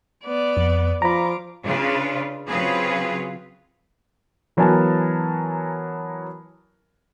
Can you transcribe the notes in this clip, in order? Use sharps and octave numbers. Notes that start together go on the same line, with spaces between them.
B3 D5
F2
F3 F4 A#5 B5 D6
C#3 D4 F4 B4
C#3 F#3 C4 F4 G#4 B4
E3 F#3 B3 A#4 G#5 A5